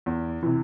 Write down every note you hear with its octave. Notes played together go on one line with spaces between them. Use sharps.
E2
C3 E3